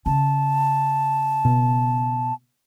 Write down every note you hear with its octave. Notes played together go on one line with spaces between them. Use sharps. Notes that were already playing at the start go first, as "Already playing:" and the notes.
C#3 A5
B2